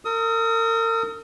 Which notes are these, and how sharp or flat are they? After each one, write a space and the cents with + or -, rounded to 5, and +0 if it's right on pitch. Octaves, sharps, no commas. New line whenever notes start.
A#4 -40 D#6 +30